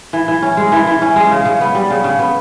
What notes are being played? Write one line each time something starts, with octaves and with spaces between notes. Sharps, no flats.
E3
E3
C#4
G#3
E3
E3
C#4
G#3
C#3
C#3
B3
G3
C#3
C#3
B3